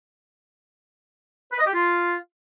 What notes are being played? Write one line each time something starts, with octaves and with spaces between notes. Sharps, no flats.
B4
D#5
G4
F4